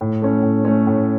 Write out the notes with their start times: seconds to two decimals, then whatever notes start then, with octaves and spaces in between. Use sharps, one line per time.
0.01 A2
0.22 A3 C#4
0.43 A2
0.65 A3 C#4
0.87 A2